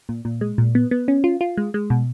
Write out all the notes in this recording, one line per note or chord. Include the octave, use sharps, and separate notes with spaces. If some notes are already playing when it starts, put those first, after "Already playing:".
A#2
A#2
G#3
A#2
B3
B3
C#4
F4
F4
G#3
G#3
B2